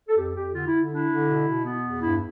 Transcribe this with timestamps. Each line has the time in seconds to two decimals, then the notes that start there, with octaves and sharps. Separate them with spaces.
0.08 A4
0.16 F2 G4
0.35 F2 G4
0.54 D3 F4
0.67 E4
0.73 D3
0.92 D4 E4
1.09 D3
1.28 B2
1.47 B2
1.65 B3
1.84 E2
2.02 G2 E4